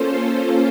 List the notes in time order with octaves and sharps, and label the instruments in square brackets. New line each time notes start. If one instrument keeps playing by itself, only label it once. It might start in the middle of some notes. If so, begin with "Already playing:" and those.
Already playing: [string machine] A#3 C#4 F4 A4 C5